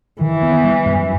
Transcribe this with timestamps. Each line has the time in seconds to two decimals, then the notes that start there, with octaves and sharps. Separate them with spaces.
0.21 D#3 E3
0.43 B3
0.64 G3
0.86 F#2